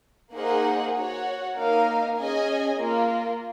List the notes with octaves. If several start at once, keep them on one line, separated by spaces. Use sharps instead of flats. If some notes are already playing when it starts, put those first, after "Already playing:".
A#3 D#4 G#4 C5 F#5
F#4 C#5 F#5
A#3 D#4 A#4 F5
C#4 G#4 D#5 G#5
A#3 F4 A#4